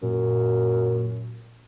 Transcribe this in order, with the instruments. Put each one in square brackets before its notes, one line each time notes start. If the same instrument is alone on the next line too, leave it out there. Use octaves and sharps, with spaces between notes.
[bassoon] F#2 [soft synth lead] A#2